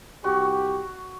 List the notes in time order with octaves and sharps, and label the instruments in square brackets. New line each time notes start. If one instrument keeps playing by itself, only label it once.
[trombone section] C2 G4 [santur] F#4 C#6